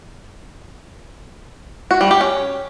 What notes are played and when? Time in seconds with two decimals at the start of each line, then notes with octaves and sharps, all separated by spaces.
1.91 F#4
2.01 G3
2.11 G4
2.21 C#4